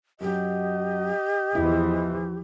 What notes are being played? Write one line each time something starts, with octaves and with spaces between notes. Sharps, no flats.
F#2 F#3 G4 D#5
E2 E3 F3 E4